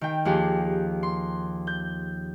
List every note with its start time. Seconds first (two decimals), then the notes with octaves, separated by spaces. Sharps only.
0.01 D#3 G5
0.25 D#2 F3 G4 G#4 G5
1.03 C6
1.67 G6